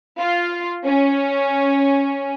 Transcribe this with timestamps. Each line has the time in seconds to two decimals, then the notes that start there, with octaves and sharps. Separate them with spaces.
0.19 F4
0.86 C#4